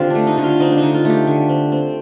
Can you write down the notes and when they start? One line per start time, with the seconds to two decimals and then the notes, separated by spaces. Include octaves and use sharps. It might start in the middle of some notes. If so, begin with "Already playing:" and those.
Already playing: D3 C4 F4 G4
0.10 A3 D4
0.27 D#4
0.38 D3
0.43 F4
0.60 C4 D#4
0.71 D4
0.77 D#4
0.83 D3
0.94 F4
1.05 A3
1.10 G4
1.27 D3
1.49 C4
1.72 C4